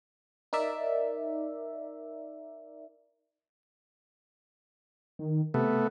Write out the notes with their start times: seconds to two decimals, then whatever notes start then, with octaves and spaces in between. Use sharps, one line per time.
0.53 D#4 A#4 D5 E5
5.19 D#3
5.54 C3 A3 B3